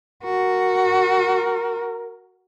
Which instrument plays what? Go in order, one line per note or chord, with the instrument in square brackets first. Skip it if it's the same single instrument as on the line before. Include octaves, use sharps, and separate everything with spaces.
[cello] F#4 [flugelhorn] A#4